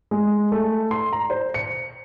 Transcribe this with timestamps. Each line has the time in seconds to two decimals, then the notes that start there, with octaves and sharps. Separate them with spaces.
0.11 G#3
0.52 A3
0.91 C6
1.13 A#5
1.30 C5
1.54 C#7